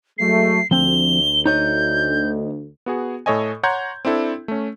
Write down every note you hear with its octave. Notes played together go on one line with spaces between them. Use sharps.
F#3 G#3 A3 C7
D2 F3 C4 G7
D#4 C#5 D#5 G6
B3 F#4 G#4
A2 A4 C#5 D#5 G#5
C#5 F#5 A#5 C6 G6 G#6
C4 D4 E4 A4
A3 C#4